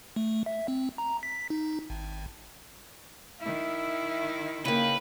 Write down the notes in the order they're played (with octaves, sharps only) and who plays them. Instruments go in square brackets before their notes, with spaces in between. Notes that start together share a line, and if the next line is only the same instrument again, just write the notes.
[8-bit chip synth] A3
E5
C4
A#5
B6
D#4
G#1
[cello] D#3 E4 [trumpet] E5
[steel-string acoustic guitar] C#3 A#3 [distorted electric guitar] B4 [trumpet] G5